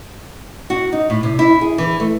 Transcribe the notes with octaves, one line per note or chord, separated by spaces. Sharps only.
F#4
D#4
A2
C3
E4
G#4
E3
A3